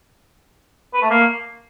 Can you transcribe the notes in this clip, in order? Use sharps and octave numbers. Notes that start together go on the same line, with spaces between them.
B4
A3
A#3